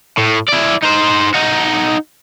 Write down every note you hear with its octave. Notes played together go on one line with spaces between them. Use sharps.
A2
E4 D5
D#4 C5
D#4 F#4